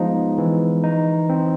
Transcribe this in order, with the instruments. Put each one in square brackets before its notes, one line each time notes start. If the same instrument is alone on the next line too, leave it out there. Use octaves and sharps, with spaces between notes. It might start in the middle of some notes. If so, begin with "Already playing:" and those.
Already playing: [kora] F3 [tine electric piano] G#3 B3 D#4
[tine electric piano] E3
D#4
C4